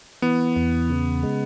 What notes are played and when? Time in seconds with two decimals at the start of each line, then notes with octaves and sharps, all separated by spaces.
0.22 E3 B3
0.56 E2
0.90 C#3
1.23 G#3